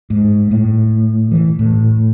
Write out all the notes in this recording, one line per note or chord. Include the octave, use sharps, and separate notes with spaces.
G#2
A2
E3
A2